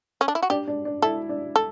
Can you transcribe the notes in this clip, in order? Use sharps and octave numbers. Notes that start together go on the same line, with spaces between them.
C#4
D4
E4
F#4
D4 G4
D4
D4
E4 A4
D4
A4